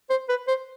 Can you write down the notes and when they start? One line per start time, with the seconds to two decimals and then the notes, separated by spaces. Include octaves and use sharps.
0.10 C5
0.29 B4
0.48 C5